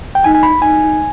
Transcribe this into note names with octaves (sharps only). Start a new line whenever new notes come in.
G5
D#4 G#5
G#5
B5
D#4 G#5